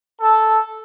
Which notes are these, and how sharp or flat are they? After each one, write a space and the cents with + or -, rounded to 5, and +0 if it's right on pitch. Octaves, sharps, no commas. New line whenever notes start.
A4 -5